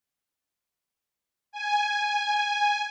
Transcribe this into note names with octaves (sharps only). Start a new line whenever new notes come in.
G#5